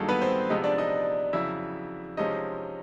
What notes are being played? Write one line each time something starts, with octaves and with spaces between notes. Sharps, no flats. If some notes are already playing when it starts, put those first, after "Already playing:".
Already playing: G2 D#3 F#3 A#3 G#4 A4
B3 B4
C4 C5
C3 F3 G#3 B3 D#4 D#5
D4 D5
D#4 D#5
F2 C#3 F#3 E4 E5
C3 F3 G#3 C#4 D#4 D#5